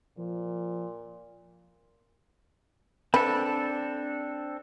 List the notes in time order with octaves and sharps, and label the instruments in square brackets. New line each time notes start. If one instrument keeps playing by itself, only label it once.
[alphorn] A#2 [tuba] F3
[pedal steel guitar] C4 D4 A4 [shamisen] B4